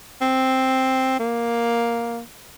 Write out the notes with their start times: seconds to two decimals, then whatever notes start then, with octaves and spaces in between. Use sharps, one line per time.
0.21 C4
1.19 A#3